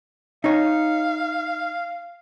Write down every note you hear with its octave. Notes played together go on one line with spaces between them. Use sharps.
D#4 C#5 F5